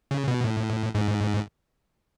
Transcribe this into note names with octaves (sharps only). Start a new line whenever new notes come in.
C#3
B2
A2
G#2